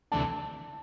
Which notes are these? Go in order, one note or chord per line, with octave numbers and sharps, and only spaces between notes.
D2 C3 E3 A3 D4 A5